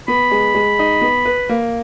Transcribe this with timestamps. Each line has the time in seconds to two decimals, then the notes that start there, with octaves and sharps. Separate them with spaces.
0.08 B3 B5
0.31 G#3
0.55 G#3
0.79 D#4
1.02 B3
1.25 B4
1.49 A#3